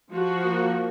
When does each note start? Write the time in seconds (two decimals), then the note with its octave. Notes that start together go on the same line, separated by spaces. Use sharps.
0.10 F3 F#4
0.45 A#3